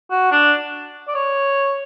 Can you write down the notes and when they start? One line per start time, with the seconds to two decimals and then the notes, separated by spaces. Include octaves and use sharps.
0.11 F#4
0.31 D4
1.07 D5
1.14 C#5